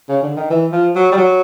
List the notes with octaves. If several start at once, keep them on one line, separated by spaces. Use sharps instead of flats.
C#3
D3
D#3
E3
F3
F#3
G3
F#3